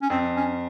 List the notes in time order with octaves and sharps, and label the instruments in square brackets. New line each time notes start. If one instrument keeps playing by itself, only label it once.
[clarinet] C#4
[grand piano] F2 [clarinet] C4
[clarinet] C#4